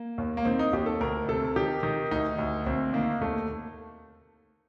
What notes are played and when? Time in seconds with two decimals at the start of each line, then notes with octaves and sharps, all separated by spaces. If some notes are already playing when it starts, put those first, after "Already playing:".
Already playing: A#3
0.18 D#2
0.37 A#3
0.45 D#3 C4
0.59 D#4
0.73 D#2 G4
0.86 A4
1.01 D2 A#4
1.28 C3 A4
1.56 D#3 G4
1.83 D#3
2.11 D2 D#4
2.39 D2
2.66 D2 C4
2.93 D#3 A#3
3.21 D#2 A3